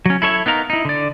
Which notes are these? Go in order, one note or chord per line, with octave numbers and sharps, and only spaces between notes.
F#3 C#4
E4 A4 C#5 E5
B3 D#4 A#4 F5 A#5
D#4 E4
D3 D5